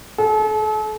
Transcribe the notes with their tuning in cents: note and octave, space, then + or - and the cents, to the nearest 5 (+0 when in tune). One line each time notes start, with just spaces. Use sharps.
A4 -40